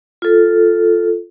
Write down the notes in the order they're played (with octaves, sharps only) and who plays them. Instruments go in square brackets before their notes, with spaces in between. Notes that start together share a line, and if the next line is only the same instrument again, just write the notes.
[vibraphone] F4 A4